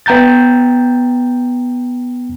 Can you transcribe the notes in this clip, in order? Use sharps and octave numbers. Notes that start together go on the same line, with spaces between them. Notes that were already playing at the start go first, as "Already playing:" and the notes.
B3 G5 A#5 G6 A6